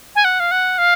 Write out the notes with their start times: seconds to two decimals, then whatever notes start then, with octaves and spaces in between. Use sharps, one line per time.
0.15 G#5
0.25 F#5
0.40 F5
0.51 F#5
0.78 F5